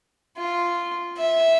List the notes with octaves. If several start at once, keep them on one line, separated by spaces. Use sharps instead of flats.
F4
E5